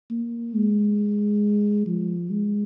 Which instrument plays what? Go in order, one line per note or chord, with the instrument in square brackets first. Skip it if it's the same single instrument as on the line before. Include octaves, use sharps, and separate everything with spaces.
[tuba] A#3
G#3
F3
G#3